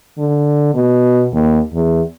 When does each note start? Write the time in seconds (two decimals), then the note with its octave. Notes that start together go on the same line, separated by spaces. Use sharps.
0.18 D3
0.74 B2
1.33 D#2
1.74 E2